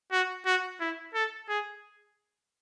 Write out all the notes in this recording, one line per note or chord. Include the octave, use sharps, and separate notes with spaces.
F#4
F#4
E4
A4
G#4